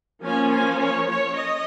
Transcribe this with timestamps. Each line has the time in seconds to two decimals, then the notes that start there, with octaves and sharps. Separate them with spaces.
0.22 F3 A#3 C#4 G#5
0.51 G#5
0.79 C#5
1.07 C#5
1.35 D#5